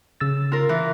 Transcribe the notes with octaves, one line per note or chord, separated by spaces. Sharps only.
C#3 E6 A6
F4 A#4
E3